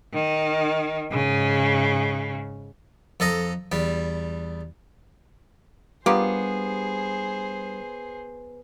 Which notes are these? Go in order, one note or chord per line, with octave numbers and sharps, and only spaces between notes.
D#3
G#2 C#3
F2 A4 D#5 A#5
E2 G3
G3 A#3 B3 D4 F4 G4 G#4 C5